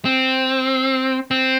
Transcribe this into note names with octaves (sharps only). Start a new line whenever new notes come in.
C4
C4